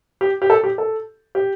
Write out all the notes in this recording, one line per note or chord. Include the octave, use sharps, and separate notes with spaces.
G4
G4
A4
G4
A4
G4